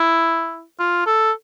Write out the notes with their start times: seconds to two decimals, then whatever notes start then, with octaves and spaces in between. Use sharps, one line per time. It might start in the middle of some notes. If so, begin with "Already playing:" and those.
Already playing: E4
0.79 F4
1.07 A4